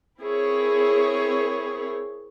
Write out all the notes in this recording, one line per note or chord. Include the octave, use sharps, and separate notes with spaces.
C4 E4 G#4 A#4 C#5